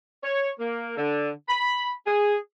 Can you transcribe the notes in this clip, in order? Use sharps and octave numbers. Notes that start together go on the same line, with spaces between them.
C#5
A#3
D3
B5
G#4